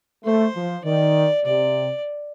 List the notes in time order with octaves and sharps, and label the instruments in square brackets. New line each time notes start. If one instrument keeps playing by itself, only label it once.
[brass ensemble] A3 [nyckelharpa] C5
[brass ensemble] F3
[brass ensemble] D#3 [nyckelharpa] D5
[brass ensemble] C3 [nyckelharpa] D5